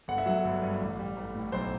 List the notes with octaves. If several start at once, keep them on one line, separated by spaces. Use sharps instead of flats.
G1 F#5
E5
F#3 F#5
G1
G2
A1
G3
A1
A2
B1 C5